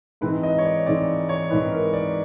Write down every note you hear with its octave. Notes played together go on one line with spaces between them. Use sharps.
G#2 E3 G#3 C4 D#4 B4
D#5
C#5
D5
G#2 E3 G#3 C4 D#4 D5
C#5
G#2 E3 G#3 C4 D#4 B4
A#4
D5